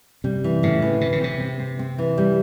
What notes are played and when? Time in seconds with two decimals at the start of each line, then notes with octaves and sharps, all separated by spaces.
0.24 C3 G3
0.44 E3
0.63 A2 C#3
0.82 E3
1.01 C3 C4
1.12 C#3
1.21 C3 C4
1.40 C4
1.60 C4
1.79 C4
1.98 E3
2.18 G3